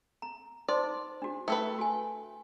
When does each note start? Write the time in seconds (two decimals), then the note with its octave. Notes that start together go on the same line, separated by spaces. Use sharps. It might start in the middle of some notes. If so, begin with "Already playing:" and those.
0.22 A#5
0.68 D#4 C5 D5 C6
1.22 D4 F#4
1.48 A3 A4 B4 G5
1.78 F#4 G#5